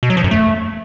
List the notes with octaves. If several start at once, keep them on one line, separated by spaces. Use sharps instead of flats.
B2
F#3
F3
F#2
A3